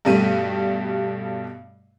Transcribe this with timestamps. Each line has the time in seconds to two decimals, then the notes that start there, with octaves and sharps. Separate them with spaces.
0.05 G2 B2 G3 A3 D#7